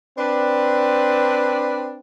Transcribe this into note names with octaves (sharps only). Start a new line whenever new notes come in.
C4 D4 B4